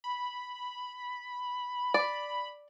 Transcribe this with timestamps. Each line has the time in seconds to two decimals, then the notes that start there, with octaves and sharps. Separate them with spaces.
0.04 B5
1.94 D5 B5